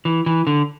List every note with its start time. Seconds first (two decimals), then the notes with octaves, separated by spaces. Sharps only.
0.05 E3
0.26 E3
0.47 D3